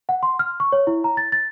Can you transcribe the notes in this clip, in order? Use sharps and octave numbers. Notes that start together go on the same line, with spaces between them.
F#5
C6
F6
C#6
C#5
E4
A#5
A6
A6